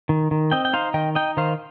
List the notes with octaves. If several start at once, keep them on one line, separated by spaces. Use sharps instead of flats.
D#3
D#3
C4 D#5 G5
G5
D#4 C5 F5
D#3 D#5 G5
D#4 D#5 G5
D#3 C5 F5